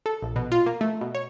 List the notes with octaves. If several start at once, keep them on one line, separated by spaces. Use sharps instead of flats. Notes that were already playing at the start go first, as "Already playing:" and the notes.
A4
A#1
B2
F4
A#3
A3
B2
C#5